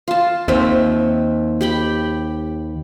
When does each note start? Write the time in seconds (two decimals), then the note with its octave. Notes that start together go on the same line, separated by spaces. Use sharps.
0.08 F4 A5
0.48 D#2 C4 E5
1.61 G4 G5 B5